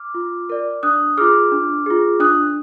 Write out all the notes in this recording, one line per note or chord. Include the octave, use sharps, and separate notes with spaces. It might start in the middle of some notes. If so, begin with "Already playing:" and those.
Already playing: D6 F6
F4
A#4 D5
D4 D#6 F#6
F4 G#4 D6 F6
D4
F4 G#4
D4 D#6 F#6